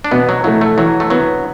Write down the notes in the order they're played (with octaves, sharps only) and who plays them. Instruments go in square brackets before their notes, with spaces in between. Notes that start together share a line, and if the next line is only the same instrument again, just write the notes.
[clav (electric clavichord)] D4
[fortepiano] B2 [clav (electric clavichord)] B3
[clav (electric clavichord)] F#3
[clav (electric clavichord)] F#3 [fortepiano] A3 E4
[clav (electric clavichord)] A3
[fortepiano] E3 [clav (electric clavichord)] F#3
[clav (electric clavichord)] A3
[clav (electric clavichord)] F#3 [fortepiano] B3 E4